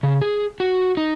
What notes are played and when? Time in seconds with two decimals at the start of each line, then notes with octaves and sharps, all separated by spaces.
0.03 C#3
0.21 G#4
0.60 F#4
0.97 D#4